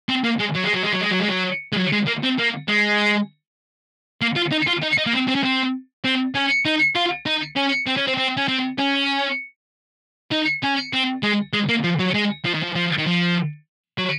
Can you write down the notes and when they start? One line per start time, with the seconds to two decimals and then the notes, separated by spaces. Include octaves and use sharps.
0.09 C4
0.24 A#3
0.39 G#3
0.55 F#3
0.64 G#3
0.73 F#3
0.83 G#3
0.92 F#3
1.01 G#3
1.11 F#3
1.19 G#3
1.28 F#3
1.73 G#3
1.76 F#3
1.92 G#3
2.07 A#3
2.23 C4
2.38 A#3
2.68 G#3
4.21 A#3
4.36 F4
4.51 D#4
4.67 F4
4.82 D#4
4.98 D#4
5.06 A#3
5.13 C4
5.28 C4
5.35 C#4
5.43 C4
6.05 C4
6.35 C#4
6.65 D#4
6.95 F4
7.26 D#4
7.56 C#4
7.87 C4
7.97 C#4
8.07 C4
8.17 C4
8.37 C#4
8.48 C4
8.78 C#4
10.31 D#4
10.63 C#4
10.93 C4
11.23 G#3
11.53 G#3
11.69 A#3
11.84 F3
11.99 F#3
12.14 G#3
12.45 F3
12.54 D#3
12.63 F3
12.75 F3
12.98 D#3
13.06 F3
13.98 F#3